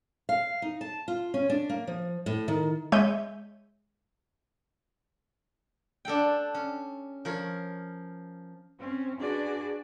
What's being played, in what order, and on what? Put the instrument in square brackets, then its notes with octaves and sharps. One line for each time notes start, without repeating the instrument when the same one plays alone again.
[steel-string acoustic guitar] F5
D#4
A5
F4
C#4
D4
A#3
F3
A2
D#3
[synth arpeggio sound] G#3 C#5 E5 G6 D#7
[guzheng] D4 A4 F#5 G5
C#4
F3 A#4 C#5
[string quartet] C4 C#4
D4 F#4 G#4 B4 D5